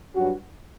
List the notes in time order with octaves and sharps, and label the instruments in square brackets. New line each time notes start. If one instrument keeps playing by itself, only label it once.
[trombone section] G2 F#3 C#4 F#4